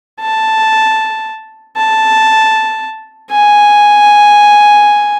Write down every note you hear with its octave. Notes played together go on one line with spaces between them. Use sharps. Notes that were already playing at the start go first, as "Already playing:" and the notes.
A5
A5
G#5